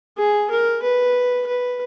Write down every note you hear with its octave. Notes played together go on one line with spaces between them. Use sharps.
G#4
A#4
B4
B4